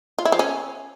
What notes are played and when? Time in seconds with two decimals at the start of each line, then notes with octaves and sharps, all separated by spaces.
0.19 F4
0.25 E4
0.32 F3
0.39 C#4